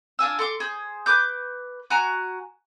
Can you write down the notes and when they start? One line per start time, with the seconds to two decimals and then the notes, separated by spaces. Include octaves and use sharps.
0.19 D4 F4 G#5 E6
0.39 A4 C6 D6
0.60 G#4 C5
1.06 B4 D6 G6
1.90 F#4 G#5 A#5